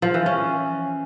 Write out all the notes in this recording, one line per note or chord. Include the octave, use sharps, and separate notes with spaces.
F3
E3
C#4